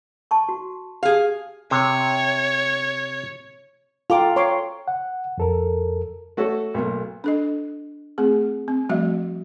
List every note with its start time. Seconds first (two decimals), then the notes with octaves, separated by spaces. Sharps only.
0.31 A5 C#6
0.49 F#4
1.03 G4 G#4 F5
1.71 C3 C#5
4.10 F4 A4 F5 G5 A#5 D6
4.36 C#5 C6 D6
4.88 F#5
5.38 F2 A4 A#4
6.37 A3 F#4 A4 C#5
6.74 B1 A3 A#3
7.24 D4 A4 D#5
8.18 A3 C4 G#4
8.68 C4
8.89 F3 G3 A3 F#4 D#5 E5